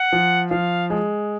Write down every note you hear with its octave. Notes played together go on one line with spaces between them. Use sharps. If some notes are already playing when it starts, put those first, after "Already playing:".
Already playing: F#5
F3
F3 F5
G#3